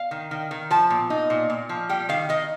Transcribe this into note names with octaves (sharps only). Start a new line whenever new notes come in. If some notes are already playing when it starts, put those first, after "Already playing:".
Already playing: F5
D#3
D#3
D#3
F3 A5
A#2
D#4
A#2
A#2
F3
G3 G5
D#3 F5
D#3 D#5